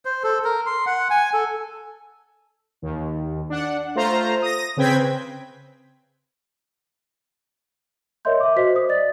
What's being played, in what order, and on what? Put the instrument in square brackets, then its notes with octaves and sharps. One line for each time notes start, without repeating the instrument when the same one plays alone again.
[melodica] C5
A4
A#4
C6
F#5
G#5
A4
[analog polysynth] D#2
D4 F#5
A3 F4 C5 A#5
D#6 A#6
C#3 C4 B4 G5 G#6 B6
[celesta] A#4 C#5 D#5 E5 C6 G6
E5 D6
F#4 C5 D#5 B6
D#6
D5 D#5 A6